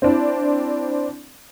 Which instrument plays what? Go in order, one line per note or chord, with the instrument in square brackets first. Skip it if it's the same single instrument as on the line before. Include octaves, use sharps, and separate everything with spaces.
[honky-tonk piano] C4 D4 E4